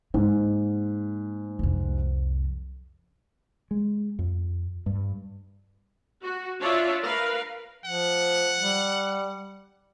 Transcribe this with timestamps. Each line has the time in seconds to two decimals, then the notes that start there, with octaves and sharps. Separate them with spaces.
0.14 G#2 A#3
1.59 C2 F2
3.71 G#3
4.19 F2
4.86 G2
6.23 F#4
6.60 D4 F4 C#5 D5 E5
7.03 A#4 B4 F5
7.85 F3 F#5
8.60 G3